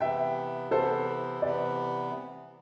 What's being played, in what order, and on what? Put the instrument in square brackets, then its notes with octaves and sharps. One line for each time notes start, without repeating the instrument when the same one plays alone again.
[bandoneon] C3 E3 B3 [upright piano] E5 G5
[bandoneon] C3 E3 B3 [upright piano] A4 C5
[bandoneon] C3 E3 B3 [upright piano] B4 D5